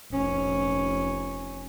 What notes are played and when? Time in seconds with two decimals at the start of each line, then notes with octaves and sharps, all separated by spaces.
0.13 F1 C#4